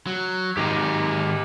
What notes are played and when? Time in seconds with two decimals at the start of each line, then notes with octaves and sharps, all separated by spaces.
0.07 F#3
0.57 G#2 D#3 G4 D#5 G#5